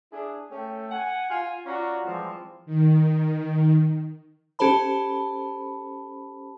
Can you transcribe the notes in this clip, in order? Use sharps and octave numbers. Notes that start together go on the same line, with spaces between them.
D4 E4 G#4
A3 C#4 A4 G5
F#5 G#5
F4 G#5
C#4 F4 F#4 D5 A#5
E3 F3 G3 G#3 C4
D#3
C#4 G4 A4 C5 A5 B5